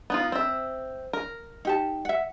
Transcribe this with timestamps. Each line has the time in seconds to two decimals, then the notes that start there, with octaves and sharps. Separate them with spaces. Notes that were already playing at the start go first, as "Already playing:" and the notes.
0.10 B3 D#4 F4
0.32 C4 E5
1.13 A#4
1.65 D#4 G4 A5
2.05 E5 F#5